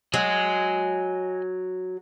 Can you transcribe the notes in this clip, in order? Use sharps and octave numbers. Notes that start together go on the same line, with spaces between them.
F#3 D#5 G#5